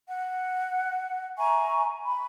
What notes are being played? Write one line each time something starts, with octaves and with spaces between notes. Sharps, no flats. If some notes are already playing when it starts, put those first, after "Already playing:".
F#5
E5 G#5 A#5 C#6
B5